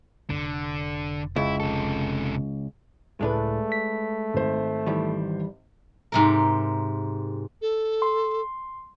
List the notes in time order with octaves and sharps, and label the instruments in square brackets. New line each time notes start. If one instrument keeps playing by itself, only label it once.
[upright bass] F1 [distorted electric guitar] D3
[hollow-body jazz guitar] C#2 [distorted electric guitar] E4
[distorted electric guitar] C3 A4
[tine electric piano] C#2 A2 [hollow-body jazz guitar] G#3 D4 B4 [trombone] A3
[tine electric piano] B6
[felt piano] G#1 C5
[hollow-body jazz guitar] D#3 E3 G3
[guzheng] G#2 C3 A#4
[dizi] A4
[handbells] C6